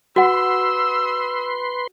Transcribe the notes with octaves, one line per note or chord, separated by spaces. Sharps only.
F#4 B4 F#5 C6 E6